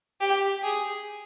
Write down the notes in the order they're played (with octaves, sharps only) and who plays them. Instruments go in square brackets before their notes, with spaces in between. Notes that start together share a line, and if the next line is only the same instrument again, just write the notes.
[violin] G4
G#4